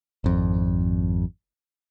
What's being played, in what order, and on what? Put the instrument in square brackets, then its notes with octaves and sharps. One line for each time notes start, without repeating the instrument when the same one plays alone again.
[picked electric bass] G#1 F2